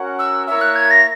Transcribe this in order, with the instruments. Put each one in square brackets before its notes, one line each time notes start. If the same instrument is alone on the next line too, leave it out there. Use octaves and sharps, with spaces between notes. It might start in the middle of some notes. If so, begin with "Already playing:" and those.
Already playing: [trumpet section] C#4 F#4 A#4 C#5 F#5
[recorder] E6
[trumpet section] A#3 E4 A#4 C#5 E5 [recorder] E6
[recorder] F#6
G#6
A#6